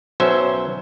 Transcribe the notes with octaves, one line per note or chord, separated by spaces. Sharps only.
B1 F#3 C#4 C5 E5